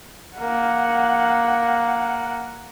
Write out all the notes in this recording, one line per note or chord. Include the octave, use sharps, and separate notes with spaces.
A#3 F#5